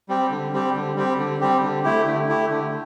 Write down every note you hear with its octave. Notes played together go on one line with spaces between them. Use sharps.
G3 C4 G4
D3
G3 C4 G4
D3
G3 C4 G4
D3
G3 C4 G4
D3
A3 E4 G4
D3
A3 E4 G4
D3